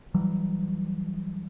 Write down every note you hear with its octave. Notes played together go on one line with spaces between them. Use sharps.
E3 F#3 G3